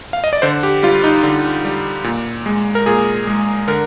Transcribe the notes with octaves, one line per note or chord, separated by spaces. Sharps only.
F5
D#5
D5
D3 C5
G4
G3 F4
D#4
D3
G3
A#2
G#3
A#4
A#2 G#4
G#3
D3 A#4